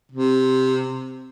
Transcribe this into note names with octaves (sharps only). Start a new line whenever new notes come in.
C3